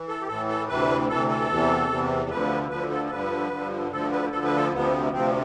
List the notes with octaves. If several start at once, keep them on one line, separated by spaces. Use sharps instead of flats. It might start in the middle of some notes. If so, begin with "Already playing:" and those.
Already playing: E3
A4
G4
A2 E3 A4
A4
D2 C3 E3 B4
D2 C3 E3 A4
A4
E2 C3 E3
E2 C3 E3
D2 D3 F3 B4
D2 D3 F3 B4
A4
A4
G2 D3 F3 B4
G2 D3 F3
D2 D3 F3 A4
B4
D2 D3 F3 A4
B4
A4
D2 C3 F3 B3
D2 C3 F3 C4